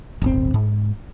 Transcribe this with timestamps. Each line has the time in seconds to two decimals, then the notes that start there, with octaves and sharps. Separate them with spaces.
0.22 D1 G1 C4
0.54 G#2